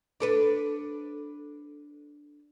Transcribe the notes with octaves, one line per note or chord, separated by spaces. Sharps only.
D4 A4 B4